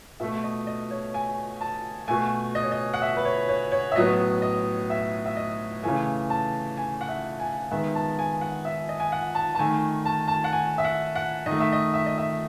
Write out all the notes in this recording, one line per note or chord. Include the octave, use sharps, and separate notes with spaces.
B2 A3 E5
D#5
D#5
C#5
G#5
A5
B2 A3 G#5
D#5
C#5
D#5
F#5
E5
B4
C#5
C#5
C#5
E5
A2 F#3 B3 D#5
D#5
E5
E5
D#5
C#3 E3 A3 G#5
A5
G#5
F#5
E5
G#5
D#3 G#3 B3 E5
A5
G#5
F#5
E5
D#5
G#5
F#5
A5
A5
D#3 A3 G#5
A5
A5
F#5
G#5
E5
F#5
F#5
D#3 D#5
A3
E5
D#5
E5
D#5
E5